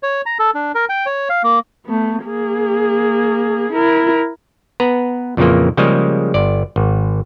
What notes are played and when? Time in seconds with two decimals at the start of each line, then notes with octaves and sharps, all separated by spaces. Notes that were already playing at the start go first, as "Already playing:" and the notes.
0.03 C#5
0.26 A#5
0.39 A4
0.54 D4
0.75 A#4
0.89 G5
1.06 C#5
1.29 F5
1.44 A#3
1.85 A3 B3
2.25 A#3 G#4
3.72 E4 A#4
4.80 B3 B4 A#5
5.37 F2 A#2 C#3 E3 F3 A#3
5.77 C#3 F3 G3 G#3 A#3
6.34 G1 D5
6.76 G#1